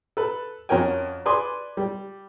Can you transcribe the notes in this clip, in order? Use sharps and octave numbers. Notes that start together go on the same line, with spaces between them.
A4 B4
F2 C#4 F#4 A#4 G5 G#5
B4 D5 G#5 C6 D6
G3